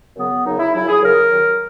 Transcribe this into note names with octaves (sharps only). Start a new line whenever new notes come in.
F#2 C#3 F#3 B3
F#2 C#3 F#3 D#4
E4
F#2 C#3 F#3 E4
G#4
F#2 C#3 F#3 A#4
F#2 D#3 F#3